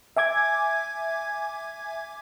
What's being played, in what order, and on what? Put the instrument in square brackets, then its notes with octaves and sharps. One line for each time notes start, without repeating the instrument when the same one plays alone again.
[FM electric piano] E5 G#5 D6 G#6